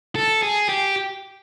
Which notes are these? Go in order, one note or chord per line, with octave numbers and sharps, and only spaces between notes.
A4
G#4
G4